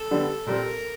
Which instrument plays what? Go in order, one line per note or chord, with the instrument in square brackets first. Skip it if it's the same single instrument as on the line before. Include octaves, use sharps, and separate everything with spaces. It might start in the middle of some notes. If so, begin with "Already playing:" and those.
Already playing: [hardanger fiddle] A4
[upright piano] D3 G3 B3
[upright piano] A#2 G3 C4 [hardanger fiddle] A#4